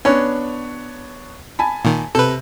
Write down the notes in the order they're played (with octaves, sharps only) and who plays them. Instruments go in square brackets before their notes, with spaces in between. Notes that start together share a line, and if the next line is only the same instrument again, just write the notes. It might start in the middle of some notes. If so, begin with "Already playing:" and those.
[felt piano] B3 D4 C#5 [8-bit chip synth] C#4
[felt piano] G#5 A5 B5
[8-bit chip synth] A#2 D#3
[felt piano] C3 [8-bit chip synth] A4 B4